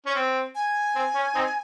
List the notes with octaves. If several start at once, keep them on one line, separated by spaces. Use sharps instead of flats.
C#4
C4
G#5
C4
C#4
C4 D#4